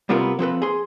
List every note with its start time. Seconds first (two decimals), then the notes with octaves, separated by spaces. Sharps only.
0.09 C2 G3 B3 C4 F4 A#4
0.39 F3 C4 A4 B4
0.62 G#4 C6